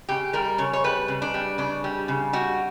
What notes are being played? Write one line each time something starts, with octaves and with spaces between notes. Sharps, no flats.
C#3 G4
G3 A#4
C#3 C#5
C#5
G3 B4
C#3
D4
G3
C#3 D4
G3
C#3
G3 F#4